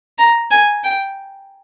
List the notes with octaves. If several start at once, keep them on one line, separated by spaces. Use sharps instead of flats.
A#5
G#5
G5